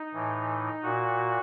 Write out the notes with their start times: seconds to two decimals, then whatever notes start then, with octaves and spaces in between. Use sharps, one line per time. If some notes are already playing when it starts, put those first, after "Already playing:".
Already playing: D#4
0.13 A2 E3
0.83 A#2 F#4